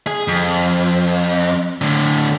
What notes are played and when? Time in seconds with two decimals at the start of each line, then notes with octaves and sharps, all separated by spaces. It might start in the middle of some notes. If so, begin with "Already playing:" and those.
0.07 G#4
0.28 F2
1.81 A2 D3